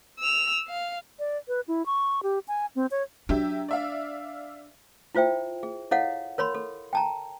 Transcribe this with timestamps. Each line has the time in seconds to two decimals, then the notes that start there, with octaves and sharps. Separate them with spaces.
0.19 E6 F7
0.68 F5
1.19 D5
1.48 B4
1.68 E4
1.86 C#6
2.23 G4
2.48 G#5
2.76 C4
2.91 C#5
3.29 F#3 D4 G4 E5
3.69 D5 E5 F5
5.15 E4 F4 C5 E5 G5
5.63 G#4
5.91 E4 A4 C#5 D#5 F5 F#5
6.38 A#4 C#5 B5 C6
6.55 A4
6.93 G5 A5 A#5